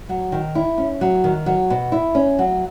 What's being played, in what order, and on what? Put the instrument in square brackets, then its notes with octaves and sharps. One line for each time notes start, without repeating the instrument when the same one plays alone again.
[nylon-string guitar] F#3
D#3
E4
C#4
F#3
D#3
F#3
B2
E4
C#4
F#3